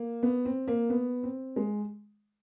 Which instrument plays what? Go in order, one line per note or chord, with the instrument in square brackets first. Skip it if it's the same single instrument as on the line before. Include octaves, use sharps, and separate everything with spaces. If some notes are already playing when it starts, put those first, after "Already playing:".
Already playing: [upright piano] A#3
B3
C4
A#3
B3
C4
G#3